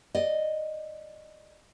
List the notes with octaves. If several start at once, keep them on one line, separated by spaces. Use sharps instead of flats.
D5 D#5